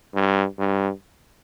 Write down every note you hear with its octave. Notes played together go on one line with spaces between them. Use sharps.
G2
G2